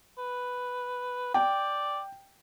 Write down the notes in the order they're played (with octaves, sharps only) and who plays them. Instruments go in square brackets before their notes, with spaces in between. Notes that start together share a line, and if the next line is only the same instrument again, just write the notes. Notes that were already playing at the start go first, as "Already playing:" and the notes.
[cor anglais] B4
[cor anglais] D5 [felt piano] G5